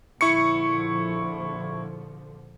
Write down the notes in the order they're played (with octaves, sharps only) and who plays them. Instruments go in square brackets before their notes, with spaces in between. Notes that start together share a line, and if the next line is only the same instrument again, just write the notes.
[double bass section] A#1 D3 F3 [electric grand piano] E4 C#6 C#7